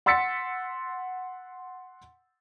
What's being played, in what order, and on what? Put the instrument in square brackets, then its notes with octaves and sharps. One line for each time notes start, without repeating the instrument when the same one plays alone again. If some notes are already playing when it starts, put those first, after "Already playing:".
[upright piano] F#5 C6 E6 A6 B6 C#7